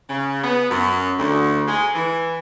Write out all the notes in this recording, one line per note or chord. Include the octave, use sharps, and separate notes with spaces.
C#3
B3
F#2
D2
G#3
E3